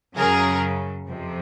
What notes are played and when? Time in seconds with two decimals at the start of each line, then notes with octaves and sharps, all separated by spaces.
0.17 F#2 C#3 F#3 G#4 A#4
1.08 F2 C3 F3